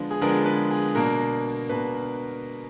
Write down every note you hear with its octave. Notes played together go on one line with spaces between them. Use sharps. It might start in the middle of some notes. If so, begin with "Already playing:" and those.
Already playing: D3 F3 G#3 B3 D4
G#4
D3 F3 G#3 B3 D4 A#4
B4
G#4
B2 A#3 D4 A#4
B2 A#3 D4 B4